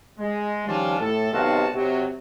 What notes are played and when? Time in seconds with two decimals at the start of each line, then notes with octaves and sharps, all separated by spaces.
0.18 G#3
0.66 D#3 F3 G3 C#4 D4 F4
0.99 A2 A4
1.32 B1 C3 D#3 F4 F#4 A5
1.74 C3 F#3